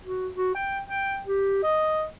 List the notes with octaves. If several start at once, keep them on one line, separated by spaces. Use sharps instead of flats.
F#4
F#4
G5
G5
G4
D#5